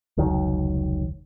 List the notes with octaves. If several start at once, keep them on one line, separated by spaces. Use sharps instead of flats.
F1 C#2 D#3 F#3